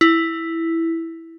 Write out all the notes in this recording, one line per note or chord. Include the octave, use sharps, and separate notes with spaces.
E4